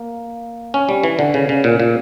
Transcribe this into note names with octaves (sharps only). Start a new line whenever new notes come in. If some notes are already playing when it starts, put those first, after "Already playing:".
Already playing: A#3
C#4
G3
E3
D3
C#3
C#3
A#2
A#2